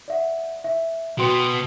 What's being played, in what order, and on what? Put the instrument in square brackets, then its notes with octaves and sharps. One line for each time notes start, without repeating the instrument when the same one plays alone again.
[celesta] D5 E5 F#5
E5
[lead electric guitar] B2 B3 [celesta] F#4 G5 C6